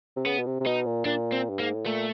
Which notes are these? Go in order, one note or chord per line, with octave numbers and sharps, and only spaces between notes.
C3
C#3 B3
B2
C3
C3
B2 D#4
A#2
A#2 D4
C4
G2
G#2 A#3
A2
A#2 A3